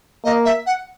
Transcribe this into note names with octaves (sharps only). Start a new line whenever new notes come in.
A#3 D#5
E5
F#5